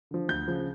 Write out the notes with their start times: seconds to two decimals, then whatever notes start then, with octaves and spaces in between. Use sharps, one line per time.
0.11 D3 F3
0.28 D2 G6
0.47 C#3 F3